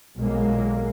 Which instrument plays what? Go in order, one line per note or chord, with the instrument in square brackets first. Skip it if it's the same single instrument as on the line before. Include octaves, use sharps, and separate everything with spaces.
[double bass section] B1 A#2 G#3 A#3